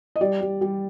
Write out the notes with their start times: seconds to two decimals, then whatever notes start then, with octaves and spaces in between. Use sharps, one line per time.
0.16 D#5
0.21 G3 D5
0.41 G3
0.61 G3